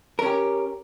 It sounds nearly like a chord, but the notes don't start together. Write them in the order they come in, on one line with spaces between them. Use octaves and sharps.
A#4 C#4 G4